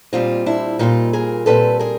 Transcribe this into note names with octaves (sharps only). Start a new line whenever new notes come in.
A#2 G3 C4 D#4 F4
D4 E4
A#2 G3 C4 D#4 F4
G#4 A#4
A#2 G3 C4 A4 B4
G#4 A#4